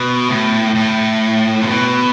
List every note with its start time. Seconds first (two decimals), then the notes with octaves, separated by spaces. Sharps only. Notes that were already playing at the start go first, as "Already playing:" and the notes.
Already playing: B2
0.29 A2
0.75 A2
1.62 C3
1.66 B2